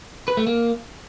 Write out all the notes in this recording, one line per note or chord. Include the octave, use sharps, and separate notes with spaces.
B4
A3
A#3